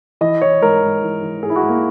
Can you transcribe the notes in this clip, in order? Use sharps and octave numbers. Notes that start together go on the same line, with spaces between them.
E3 D#5
E3 C#5
G#2 A#4
G#2
E3
E3
G#2 G#4
E4
F#4
G#2
A#3